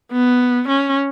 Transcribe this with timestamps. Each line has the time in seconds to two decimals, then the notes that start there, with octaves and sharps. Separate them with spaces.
0.12 B3
0.68 C#4